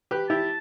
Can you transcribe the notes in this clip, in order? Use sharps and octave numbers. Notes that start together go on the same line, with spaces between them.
G4 B4
E4 G4 A5